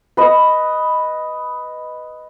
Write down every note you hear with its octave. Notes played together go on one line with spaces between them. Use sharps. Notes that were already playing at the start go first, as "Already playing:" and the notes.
B4 D#5